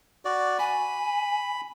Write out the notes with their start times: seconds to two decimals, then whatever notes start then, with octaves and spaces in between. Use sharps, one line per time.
0.25 F#4 D5
0.59 G#5 B5